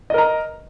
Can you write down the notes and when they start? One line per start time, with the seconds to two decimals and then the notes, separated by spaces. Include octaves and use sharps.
0.10 D#5
0.14 A#4
0.18 A#5